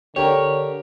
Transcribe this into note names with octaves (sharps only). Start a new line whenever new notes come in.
D3 G4 A#4 C#5